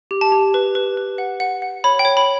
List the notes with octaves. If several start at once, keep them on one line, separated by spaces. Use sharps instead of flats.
G4
A5
G4
B4
B4
B4
F#5
F#5
F#5
C#5 B5
G5
C#5
B5